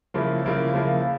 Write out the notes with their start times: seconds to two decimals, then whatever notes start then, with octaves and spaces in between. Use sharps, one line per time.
0.14 C#3 F3 A#3 E4
0.44 C#3 F3 A#3 E4
0.74 C#3 F3 A#3 E4